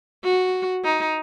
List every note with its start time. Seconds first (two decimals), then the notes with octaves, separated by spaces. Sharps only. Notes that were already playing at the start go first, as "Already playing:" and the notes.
0.24 F#4
0.85 D#4